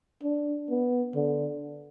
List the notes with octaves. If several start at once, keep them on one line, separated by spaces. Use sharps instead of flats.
D4
B3
D3